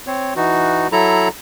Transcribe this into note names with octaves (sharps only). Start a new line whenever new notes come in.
C4 C#5
E3 D#4 F#4
F#3 E4 A4 A#5